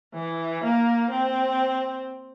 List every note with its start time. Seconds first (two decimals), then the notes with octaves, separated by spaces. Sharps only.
0.14 E3
0.64 A#3
1.11 C4